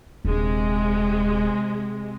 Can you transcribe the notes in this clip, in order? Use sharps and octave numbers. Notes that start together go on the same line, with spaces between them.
D#1 C3 G#3 D4